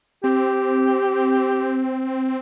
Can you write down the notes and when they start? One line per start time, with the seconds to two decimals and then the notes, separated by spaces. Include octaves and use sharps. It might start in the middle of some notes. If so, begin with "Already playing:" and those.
0.24 C4 G4